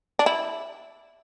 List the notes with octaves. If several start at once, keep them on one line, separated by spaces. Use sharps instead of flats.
D4
E4